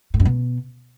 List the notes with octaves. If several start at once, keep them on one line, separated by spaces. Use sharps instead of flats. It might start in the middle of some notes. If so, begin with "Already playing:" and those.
A2
F#2
B2